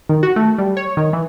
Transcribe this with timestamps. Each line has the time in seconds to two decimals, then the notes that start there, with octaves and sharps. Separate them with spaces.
0.09 D#3
0.23 F#4
0.36 A3
0.58 G3
0.77 C#5
0.97 D#3
1.13 E3